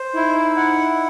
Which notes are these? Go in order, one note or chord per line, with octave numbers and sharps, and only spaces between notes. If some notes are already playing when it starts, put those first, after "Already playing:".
Already playing: C5
D#4 E4
F#5